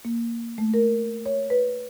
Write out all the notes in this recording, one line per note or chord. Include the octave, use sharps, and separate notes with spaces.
A#3
A3
A#4
C#5
B4